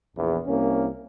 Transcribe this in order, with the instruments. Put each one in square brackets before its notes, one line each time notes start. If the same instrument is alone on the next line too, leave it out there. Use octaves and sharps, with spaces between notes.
[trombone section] A#1 E2
C2 A#3 C#4